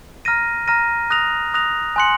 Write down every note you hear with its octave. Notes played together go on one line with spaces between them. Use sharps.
A#5 F6 A#6 D#7
A#5 F6 A#6 D#7
D#6 F#6 A#6 F7
D#6 F#6 A#6 F7
G#5 C6 F#6 C#7 F#7